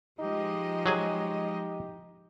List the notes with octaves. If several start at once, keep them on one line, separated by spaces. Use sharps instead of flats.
F3 G#3 D#4 G4 D#5
F#3 G#4 G#5